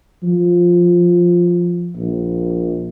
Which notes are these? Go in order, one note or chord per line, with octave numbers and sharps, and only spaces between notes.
F3
A#1